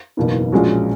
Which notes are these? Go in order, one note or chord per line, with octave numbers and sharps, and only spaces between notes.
F#1 E2 B2 A#3 D#4
A#1 A#2 G#3 C#4 F#4